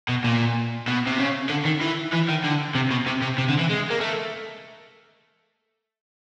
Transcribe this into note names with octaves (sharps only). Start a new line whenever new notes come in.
B2
A#2
B2
C3
C#3
D3
D#3
E3
E3
D#3
D3
C3
B2
C3
C3
C3
D3
E3
G#3
A#3
A3